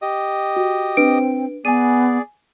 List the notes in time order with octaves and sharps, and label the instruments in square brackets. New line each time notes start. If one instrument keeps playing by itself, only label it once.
[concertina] G4 D#5
[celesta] F#4
[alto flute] C4 [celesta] D4 B4 D7
[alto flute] B3 [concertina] G#4 D5 [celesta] G#5 D#7